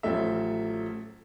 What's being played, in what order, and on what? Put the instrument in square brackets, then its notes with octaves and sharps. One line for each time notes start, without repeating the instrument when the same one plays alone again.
[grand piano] A1 F3 F#3 A3 E5